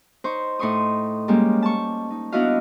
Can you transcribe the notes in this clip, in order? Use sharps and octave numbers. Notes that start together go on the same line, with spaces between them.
D#4 C5 C#6
A2 D#4 C6 C#6 D#6
G3 G#3 A#3 C#4 G4
A5 C#6
D#4
B3 D4 E4 F#4 D#5 F5